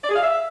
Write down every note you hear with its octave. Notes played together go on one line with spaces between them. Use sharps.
D5
G#4
F5
E5